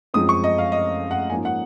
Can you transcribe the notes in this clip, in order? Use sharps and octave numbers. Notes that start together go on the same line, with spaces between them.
F#2 F3 G#3 C4 D#6
C#6
D#5
F5
D#5
F#5
G#2 F3 A#3 C#4 G#5
F#5